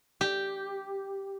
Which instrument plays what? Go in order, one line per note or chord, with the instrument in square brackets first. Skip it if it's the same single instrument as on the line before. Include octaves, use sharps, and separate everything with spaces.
[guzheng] G4